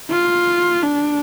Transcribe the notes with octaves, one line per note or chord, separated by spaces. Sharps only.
F4
D4